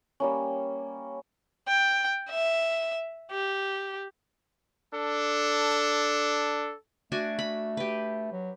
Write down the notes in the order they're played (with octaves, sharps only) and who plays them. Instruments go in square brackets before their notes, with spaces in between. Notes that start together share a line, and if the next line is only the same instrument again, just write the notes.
[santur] G3 A#3 C#4
[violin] G5
E5
G4
[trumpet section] D4 A4
[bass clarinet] A3 [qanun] D4 F#4 G#5
[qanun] B5
G4 B4
[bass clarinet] F#3